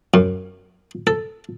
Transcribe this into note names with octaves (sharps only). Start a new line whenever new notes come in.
F#2
A4